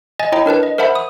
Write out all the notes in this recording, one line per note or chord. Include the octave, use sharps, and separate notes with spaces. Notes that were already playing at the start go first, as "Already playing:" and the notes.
D#5 G#5 A6
E4 C#5 D#5 G5 A#5
D4 A#4 B4 A5
D#5
A#4 C5 E5 F#5 A5 B5
D#6